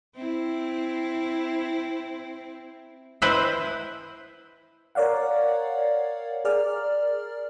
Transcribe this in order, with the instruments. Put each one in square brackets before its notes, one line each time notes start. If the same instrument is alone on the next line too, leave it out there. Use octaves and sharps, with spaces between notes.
[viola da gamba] C4 E4
[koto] E4 B4 C5 D#5 E5
[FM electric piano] A#4 C#5 D5 F5 F#5
G#4 A#4 D5 F6